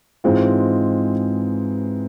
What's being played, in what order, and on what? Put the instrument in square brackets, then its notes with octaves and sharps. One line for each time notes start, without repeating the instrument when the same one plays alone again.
[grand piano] G#2 E3 G#3 C4 F4